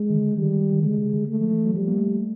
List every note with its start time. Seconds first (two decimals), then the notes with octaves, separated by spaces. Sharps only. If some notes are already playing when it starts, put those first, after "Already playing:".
Already playing: G#3
0.10 D#3
0.14 D3
0.37 D#3 G3
0.73 D#3
0.83 D3 G#3
0.98 C#3
1.13 D3
1.28 A3
1.40 F3
1.51 E3
1.65 F#3
1.74 F3 G3
1.88 A#3
1.97 A3